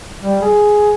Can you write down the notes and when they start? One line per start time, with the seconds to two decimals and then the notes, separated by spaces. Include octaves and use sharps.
0.22 G3
0.42 G#4